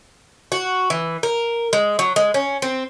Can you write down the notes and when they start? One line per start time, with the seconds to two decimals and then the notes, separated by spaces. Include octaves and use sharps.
0.52 F#4
0.90 E3
1.23 A#4
1.73 G#3
1.99 F#3
2.16 G#3
2.34 C#4
2.62 C4